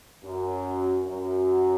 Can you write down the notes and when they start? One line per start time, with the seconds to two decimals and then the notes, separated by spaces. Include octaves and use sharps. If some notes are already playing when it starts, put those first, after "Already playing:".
0.23 F#2
1.05 F#2